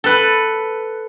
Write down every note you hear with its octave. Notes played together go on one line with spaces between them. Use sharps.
A4 B4